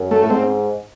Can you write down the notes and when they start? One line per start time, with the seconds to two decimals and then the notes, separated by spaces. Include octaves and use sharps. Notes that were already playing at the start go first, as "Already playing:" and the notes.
Already playing: F#2
0.11 A3
0.23 A2
0.30 G#2 C4